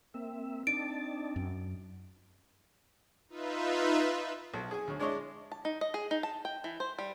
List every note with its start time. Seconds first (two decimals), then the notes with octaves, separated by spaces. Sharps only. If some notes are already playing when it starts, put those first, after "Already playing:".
0.14 A#3 C4 E5
0.67 D4 D#4 A5 D7
1.36 F#2
3.29 D#4 F4 B4 E5
4.54 B1 A4
4.71 G#4 G#5
4.88 D2 C#5
5.00 G#3 D4 E4 C#5 D#5
5.52 A5
5.65 D#4
5.81 D#5
5.94 G#4
6.11 D#4
6.23 A5
6.45 G5
6.64 E3
6.80 C5
6.99 G3